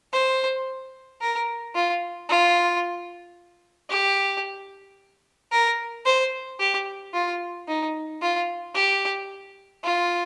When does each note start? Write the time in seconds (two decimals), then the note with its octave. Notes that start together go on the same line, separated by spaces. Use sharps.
0.13 C5
1.21 A#4
1.75 F4
2.29 F4
3.90 G4
5.52 A#4
6.06 C5
6.59 G4
7.14 F4
7.68 D#4
8.22 F4
8.75 G4
9.84 F4